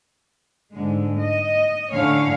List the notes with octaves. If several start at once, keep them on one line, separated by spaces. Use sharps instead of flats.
G#2 D3 G#3
D#5
A2 D3 C#4 C#5 F5